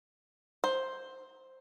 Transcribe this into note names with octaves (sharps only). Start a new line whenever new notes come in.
C5